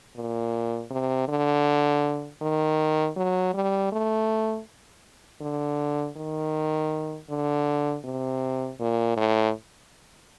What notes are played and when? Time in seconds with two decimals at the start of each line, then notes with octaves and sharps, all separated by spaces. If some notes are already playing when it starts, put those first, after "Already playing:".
0.16 A#2
0.91 C3
1.28 D3
2.42 D#3
3.16 F#3
3.54 G3
3.92 A3
5.41 D3
6.17 D#3
7.29 D3
8.04 C3
8.80 A#2
9.17 A2